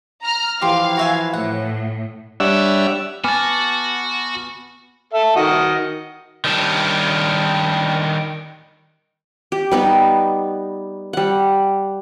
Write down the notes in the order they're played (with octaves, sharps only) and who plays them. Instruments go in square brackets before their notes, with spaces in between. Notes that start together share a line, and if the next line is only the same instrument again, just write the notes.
[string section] A#5 F6
[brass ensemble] E3 F3 [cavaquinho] G4 C6 [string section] F5
[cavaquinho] F#4 E5 G#5
[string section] A2 [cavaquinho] F#5
[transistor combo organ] G3 D4 C#5 E5 F#5 E6
[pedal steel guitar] B3 A5 [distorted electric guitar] F#4 [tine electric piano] G#5 D6 F6
[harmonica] A4 E5
D#3 F#4 D#5
[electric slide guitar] D#3 G3 D4
[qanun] G4
G3 B3 D#4
G3 F#5